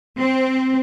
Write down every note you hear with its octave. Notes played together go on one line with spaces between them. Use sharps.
C4